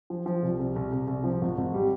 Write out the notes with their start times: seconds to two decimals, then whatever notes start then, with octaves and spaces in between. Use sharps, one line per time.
0.10 F3
0.26 F3
0.42 C2
0.59 C2
0.76 C2
0.92 C2
1.08 C2
1.24 F3
1.41 G#1
1.58 G#1
1.74 G3